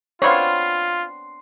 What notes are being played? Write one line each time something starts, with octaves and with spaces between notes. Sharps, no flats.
B3 C4 D4 F4 C#5 F5 C6